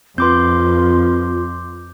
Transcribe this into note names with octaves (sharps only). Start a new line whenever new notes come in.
F2 C4 F4 B4 C6 D6 G6